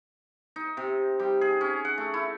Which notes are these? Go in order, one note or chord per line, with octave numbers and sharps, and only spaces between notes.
D#4
C3
G3
G#4
C#4
F#5
A3
E4